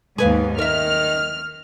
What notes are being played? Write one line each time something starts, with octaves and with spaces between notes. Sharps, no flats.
D#2 G#2 B3 G#4 B4 F5
D#3 A#4 E5 F6